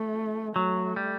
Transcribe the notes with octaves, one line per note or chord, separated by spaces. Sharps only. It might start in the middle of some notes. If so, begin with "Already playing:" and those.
Already playing: A3
F#3 A3
G3